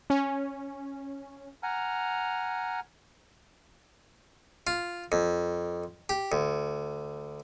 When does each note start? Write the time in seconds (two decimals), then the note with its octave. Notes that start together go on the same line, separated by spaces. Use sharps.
0.10 C#4
1.63 F#5 G#5 A#5 F6
4.67 F4
5.12 F2
6.09 G4
6.32 D2